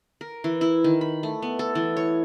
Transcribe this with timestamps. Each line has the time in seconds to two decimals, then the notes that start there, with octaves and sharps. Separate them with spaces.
0.21 A#4
0.44 E3
0.61 E4
0.84 D#3
1.01 B5
1.23 A3
1.42 B3
1.59 A4
1.75 E3
1.97 C#5